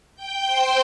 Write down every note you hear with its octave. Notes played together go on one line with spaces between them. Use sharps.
G5 G6
C5 C6